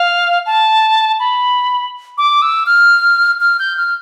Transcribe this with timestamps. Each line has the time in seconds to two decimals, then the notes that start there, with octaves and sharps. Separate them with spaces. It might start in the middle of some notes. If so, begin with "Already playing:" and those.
Already playing: F5
0.46 A5
1.19 B5
2.18 D6
2.42 E6
2.66 F6
3.41 F6
3.59 G6
3.77 F6